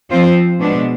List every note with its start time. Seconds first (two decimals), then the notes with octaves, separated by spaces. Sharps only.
0.11 F3 C4 F4 C5
0.59 B2 G#3 B3 D4